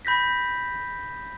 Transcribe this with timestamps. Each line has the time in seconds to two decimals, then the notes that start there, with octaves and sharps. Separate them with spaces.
0.05 B5 G6 A#6 B6